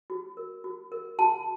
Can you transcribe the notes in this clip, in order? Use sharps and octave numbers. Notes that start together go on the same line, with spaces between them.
F#4
A#4
F#4
A#4
F#4 A5